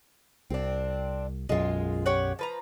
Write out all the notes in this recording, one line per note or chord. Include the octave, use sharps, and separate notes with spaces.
C2 C4 D4
B1 F#2 G#3 F4
G4 C#5 F#5
F3 B4 A#5